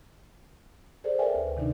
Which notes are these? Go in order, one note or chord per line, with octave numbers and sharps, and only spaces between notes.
G#4 A4 C5 D5
A#4 B4 D5 E5 G5 G#5
D2
C3 D#3 D4 D#4